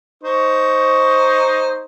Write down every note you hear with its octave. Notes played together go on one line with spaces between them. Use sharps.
D#4 C5 C#6